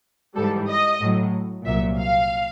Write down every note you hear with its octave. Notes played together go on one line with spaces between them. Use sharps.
G#2 E3 G3 A4
D#5
A2 F#3
C2 A#2 F#3 E5
F5